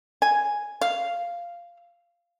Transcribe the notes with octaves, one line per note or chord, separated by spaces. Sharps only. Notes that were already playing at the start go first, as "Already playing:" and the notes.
G#5
F5